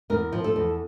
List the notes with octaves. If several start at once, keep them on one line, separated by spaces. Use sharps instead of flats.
E2 A#4
F3
A4
E2